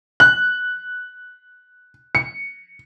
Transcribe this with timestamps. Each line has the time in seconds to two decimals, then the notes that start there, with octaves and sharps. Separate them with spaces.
0.20 F#6
2.15 C#7